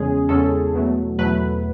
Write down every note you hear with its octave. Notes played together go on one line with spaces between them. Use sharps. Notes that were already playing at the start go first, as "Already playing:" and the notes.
Already playing: E2 C#3 G#3 C#4 G#4
E2 C#3 G#3 C#4 A4
E2 B2 F#3 A3
E2 B2 F#3 A3 B4